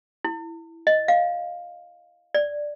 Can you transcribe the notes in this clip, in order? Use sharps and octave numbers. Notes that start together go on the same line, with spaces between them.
E4
D#5
F5
D5